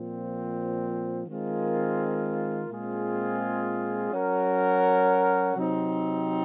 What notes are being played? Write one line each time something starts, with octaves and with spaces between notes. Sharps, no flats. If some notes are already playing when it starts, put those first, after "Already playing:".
Already playing: A#2 F3 C4
D#3 G#3 C4 F4 A#4
A#2 G#3 C4 F4 G#4
F#3 C#4 F#4 A#4
C3 F#3 C4 D#4